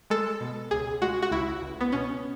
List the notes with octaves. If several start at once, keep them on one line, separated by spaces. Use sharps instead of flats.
G#3 A4
B2
C#2 G#4
G#3 F#4
F#4
C#2 E4
C#2
B3
B2 C#4